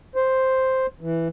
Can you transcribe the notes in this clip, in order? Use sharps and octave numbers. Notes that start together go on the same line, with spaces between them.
C5
E3